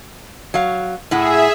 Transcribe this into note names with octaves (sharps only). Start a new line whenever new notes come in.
F#3 F5
A2 E4 G#4 E5 F#5